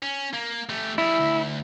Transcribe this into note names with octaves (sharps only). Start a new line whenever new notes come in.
C#4
A#3
A3 G4
G3 E4 G#4
D2